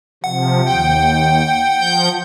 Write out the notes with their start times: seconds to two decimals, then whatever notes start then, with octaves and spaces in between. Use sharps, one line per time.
0.24 C3 F3 F#5
0.66 D#2 G5
1.79 F3 G6